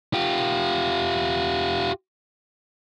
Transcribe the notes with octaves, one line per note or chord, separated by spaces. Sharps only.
F4 G4